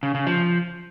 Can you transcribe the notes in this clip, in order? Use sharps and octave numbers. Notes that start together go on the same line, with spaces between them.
C#3
C#3
F3